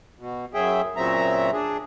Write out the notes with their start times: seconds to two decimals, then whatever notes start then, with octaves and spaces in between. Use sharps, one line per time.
0.19 B2
0.54 F#2 F#3 G#4 E5 G5
0.97 A#2 C#3 F#3 C4 E5 A#5
1.53 D4 G#4